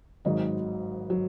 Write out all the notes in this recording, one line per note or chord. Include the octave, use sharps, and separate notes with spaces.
G#1 G#2 F#3 D#5
F#3